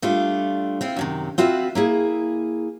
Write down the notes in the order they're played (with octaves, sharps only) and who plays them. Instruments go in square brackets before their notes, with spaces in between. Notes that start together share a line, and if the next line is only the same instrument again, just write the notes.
[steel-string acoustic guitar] G3 A3 D4 F4
C4 E4 F4
F#2 C3 D#3
C4 F4 F#4 B4 E5
A#3 E4 G#4